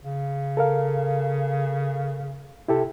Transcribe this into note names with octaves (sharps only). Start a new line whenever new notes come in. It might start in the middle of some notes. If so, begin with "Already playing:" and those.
C#3
A4 A#4 F5
C3 E4 G4 A4